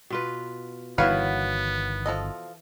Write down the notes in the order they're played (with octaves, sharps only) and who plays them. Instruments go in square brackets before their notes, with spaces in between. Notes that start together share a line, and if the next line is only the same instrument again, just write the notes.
[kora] B2 F4 B4
[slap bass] G1 D#3 [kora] E3 F#4 B4 [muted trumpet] B3 [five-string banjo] C#5 F5
[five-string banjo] F3 A4 D#5